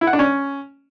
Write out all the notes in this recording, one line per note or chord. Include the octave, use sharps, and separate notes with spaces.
E4
F#5
D4
C#4